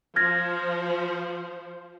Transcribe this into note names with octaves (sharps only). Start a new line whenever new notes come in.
F3 C5 F6 G#6 A#6